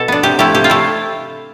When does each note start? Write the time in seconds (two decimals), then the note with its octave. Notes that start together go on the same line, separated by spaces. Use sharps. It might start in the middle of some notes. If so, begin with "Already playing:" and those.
Already playing: B2 A4
0.08 B3 D4
0.23 C3 G4
0.39 F3 A3 E4 G4
0.54 C3 G4
0.64 F4
0.70 A3 E4